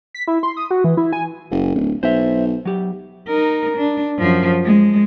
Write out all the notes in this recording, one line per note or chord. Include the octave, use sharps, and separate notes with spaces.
B6
E4
C6
D#6
F#4
E3
E4
G#5
F#1
D1
B1 C5 E5
F#3 G4
D#4 A#4
D4
F#2 F3
G#3